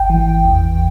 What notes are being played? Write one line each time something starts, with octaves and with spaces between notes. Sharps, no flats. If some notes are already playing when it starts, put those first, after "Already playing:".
Already playing: G#1 G5
E3
E2